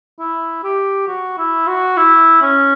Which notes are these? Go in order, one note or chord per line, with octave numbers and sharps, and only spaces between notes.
E4
G4
F#4
E4
F#4
E4
C#4